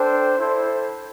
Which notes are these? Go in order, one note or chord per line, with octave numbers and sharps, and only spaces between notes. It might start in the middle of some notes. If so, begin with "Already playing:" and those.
Already playing: D4 A4 C5 G5
E4 A4 C5